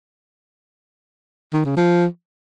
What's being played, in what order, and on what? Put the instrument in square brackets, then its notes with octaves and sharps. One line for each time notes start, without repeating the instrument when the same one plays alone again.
[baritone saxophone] D#3
C#3
F3